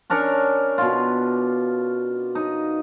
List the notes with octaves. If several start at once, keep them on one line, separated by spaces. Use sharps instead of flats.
C#4 D4 A#4 C#5
B2 F4
D#4